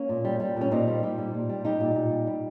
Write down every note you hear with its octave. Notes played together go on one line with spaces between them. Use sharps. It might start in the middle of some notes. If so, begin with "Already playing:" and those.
Already playing: A#3 C#4
A#2
G3
G3
A#2 C#4
A#2 C4 D#4
G3
G3
A#2
A#2
G3
G3 D#4 G4
A#2
A#2
G3
G3